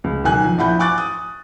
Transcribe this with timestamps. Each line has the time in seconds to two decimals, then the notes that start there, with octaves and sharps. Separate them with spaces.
0.04 C#2
0.24 B1 D#3 G#5 F#6
0.44 F3
0.58 A#1 E4 F#5 B5 G6
0.79 G#5 C#6 D6 F#6 A6
0.98 D#6